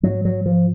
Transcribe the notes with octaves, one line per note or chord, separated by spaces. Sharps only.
G#2 F#3
F#3
F3